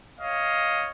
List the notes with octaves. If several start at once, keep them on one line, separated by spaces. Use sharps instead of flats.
C#5 D#5 F5